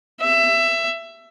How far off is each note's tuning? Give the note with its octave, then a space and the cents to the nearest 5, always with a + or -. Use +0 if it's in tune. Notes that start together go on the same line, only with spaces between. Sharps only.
E5 +20